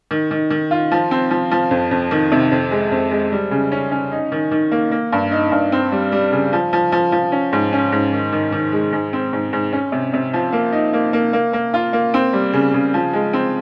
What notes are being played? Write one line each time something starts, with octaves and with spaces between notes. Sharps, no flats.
D#3
D#3
D#3
F4
F3
C4
F3
F3
F2
F2
D#3
C3
F2
G#3
F2
G#3
G3
C#3
C#4
C#4
D#4
D#3
D#3
A#3
A#3
G2
D#4
G2
C4
G3
G3
C#3
F3
F3
F3
F3
C#4
G#2
C#4
G#2
D#3
D#3
D#3
G#3
G#2
C4
G#2
G#2
C#4
C3
C3
F3
A#3
D#4
A#3
A#3
A#3
A#3
F4
A#3
C4
G3
C#3
C#3
F3
G#3
C4